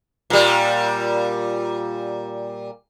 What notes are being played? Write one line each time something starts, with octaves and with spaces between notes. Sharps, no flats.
A#2 G3